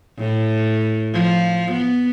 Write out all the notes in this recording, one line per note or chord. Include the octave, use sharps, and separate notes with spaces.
A2
F3
B3